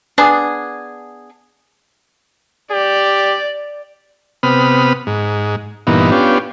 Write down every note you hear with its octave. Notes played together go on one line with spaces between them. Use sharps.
B3 D4 G#4
G4 D5
C3 B3 B5 D#6 F6
G#2
G2 A#2 E3 B3 D#4
B3 C#4 D4 F4 G4